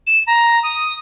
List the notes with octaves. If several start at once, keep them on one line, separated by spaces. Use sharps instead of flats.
E7
A#5
D#6